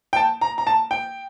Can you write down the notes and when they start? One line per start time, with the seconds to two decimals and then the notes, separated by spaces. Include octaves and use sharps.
0.13 G5
0.16 A5
0.41 A#5
0.58 A#5
0.67 A5
0.91 G5